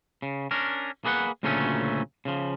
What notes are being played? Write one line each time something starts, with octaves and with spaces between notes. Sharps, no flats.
C#3
C#4 D4 A#4
A#3 G#4 B4 D5 F#5
D2 A#2 C#3 F#3 A3 C#4
C#3 F3